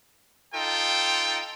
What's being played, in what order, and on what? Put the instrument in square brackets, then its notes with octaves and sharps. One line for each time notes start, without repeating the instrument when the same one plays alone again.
[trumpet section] D#4 F4 A4 G5